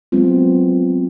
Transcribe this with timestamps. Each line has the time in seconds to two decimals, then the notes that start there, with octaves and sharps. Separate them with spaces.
0.12 F#3 G#3 B3 C4 F4